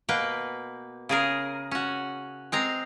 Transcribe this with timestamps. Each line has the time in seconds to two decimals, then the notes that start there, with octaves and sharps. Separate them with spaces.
0.09 B2 A#3 B4 G5
1.09 C#3 G#4 A#4
1.71 C#4 F#4
2.52 G#3 C4 A#5